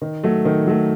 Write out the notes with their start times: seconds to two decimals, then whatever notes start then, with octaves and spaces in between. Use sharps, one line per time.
0.02 D#3
0.24 F#3 A3
0.45 D#3
0.67 F#3 A3